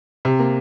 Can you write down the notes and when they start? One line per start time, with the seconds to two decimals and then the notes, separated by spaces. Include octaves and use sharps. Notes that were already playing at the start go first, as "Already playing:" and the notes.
0.25 C3
0.39 A#3